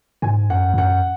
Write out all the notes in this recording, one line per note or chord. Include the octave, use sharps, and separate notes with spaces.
G#2 G#5
F#2 F#5
G#2
F#2 F#5